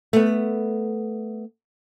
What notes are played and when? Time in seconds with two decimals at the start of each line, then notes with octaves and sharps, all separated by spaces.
0.13 A3 B3